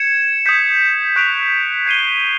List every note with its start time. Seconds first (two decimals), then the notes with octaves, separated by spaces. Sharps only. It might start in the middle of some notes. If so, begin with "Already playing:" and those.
Already playing: G#6 C#7 E7
0.46 D#6 G6 B6
1.16 C#6 F#6 B6 D7 F7
1.86 G#6 C7 D#7 G7